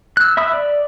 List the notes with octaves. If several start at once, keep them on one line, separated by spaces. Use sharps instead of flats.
E6 F#6
E5 B5 D#6 E6
D5